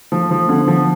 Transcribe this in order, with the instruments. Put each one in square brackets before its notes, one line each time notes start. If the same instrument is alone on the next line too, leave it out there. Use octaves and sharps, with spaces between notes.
[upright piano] F3 [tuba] A3
[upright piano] F3
[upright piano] D3 [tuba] B3
[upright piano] F3